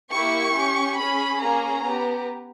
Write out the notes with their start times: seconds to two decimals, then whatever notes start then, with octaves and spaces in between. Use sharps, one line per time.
0.10 A#3 E4 G4 C#6
0.54 C#4 G4
0.97 C#4 G#4 B5
1.40 A#3 C#4 G#4 A#5
1.83 B3 G4